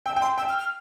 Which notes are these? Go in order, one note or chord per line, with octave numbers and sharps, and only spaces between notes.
G5 E6
G5
C6
G5 E6
F6
F6